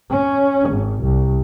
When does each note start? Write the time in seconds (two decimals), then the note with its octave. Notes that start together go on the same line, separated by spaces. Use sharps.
0.13 C#4
0.68 G#1
1.05 C2